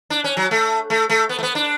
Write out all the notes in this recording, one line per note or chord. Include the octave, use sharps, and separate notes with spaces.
D4
C#4
F#3
A3
A3
A3
B3
A3
B3
D4